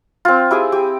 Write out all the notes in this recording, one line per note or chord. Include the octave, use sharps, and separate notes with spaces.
C4 F4
E4 G4 G#4 G#5
G4